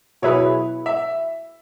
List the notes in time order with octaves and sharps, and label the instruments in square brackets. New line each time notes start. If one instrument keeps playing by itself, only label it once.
[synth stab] B2 F#3 E4 G#4 B4 [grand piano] C#5
[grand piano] E5